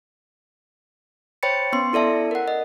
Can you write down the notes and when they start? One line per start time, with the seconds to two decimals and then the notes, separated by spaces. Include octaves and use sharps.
1.43 C5 C#5 G5 B5 A6 C#7
1.73 B3 C#4 C6
1.93 E4 A4 D5 E5 A5
2.31 A#4 F#5
2.48 D#5